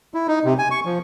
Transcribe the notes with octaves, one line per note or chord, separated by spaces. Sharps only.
E4
D#4
C3
G#5
C#6
F3